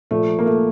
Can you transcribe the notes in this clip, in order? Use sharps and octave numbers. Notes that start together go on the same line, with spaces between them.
A#2 F3 A3
A#3
A3